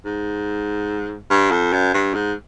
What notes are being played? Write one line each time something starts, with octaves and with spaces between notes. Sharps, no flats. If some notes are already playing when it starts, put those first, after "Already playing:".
G#2
G2
F2
F#2
G2
G#2